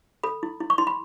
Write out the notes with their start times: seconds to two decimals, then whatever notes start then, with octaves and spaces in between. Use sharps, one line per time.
0.23 A4 B5
0.43 E4
0.60 E4
0.70 C#6
0.78 E4 C6
0.87 B5